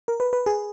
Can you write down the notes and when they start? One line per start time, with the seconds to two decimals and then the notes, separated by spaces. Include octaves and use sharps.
0.08 A#4
0.20 B4
0.33 B4
0.46 G#4